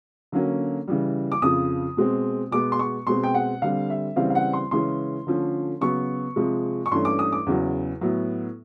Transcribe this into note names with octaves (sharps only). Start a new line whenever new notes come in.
D3 F#3 A#3 C#4
C#3 E3 G3
D6
F2 C#3 F3 D#6
B2 G#3 C4
B2 G#3 B3 D6
C6
C#6
B2 G#3 C4 C6
G5
F#5
D3 G3 C4 F5
E5
C#3 E3 G3 C4 F5
F5
F#5
C6
C#3 E3 G#3 C#4 C6
D3 F3 A3 C#4
C#3 F#3 B3 C#6
C3 F3 G#3
C#6
G2 E3 A3 C#4 C6
D6
D#6
D6
E2 C#3 F#3
A2 F#3 B3